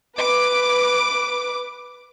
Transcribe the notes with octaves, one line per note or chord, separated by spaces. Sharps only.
B4 D6